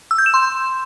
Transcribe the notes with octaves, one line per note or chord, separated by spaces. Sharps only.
E6
G6
E7
C6